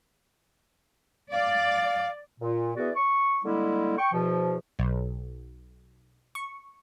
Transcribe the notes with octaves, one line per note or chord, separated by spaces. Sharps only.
D5 F5
A#2
E3 B3 F#4 G#4 D5
C#6
D3 G3 G#3 A#3 E4
G5 C#6
E2 B2 F3
B1
C#6